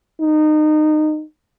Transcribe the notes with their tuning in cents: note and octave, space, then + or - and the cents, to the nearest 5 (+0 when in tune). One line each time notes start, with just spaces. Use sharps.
D#4 -25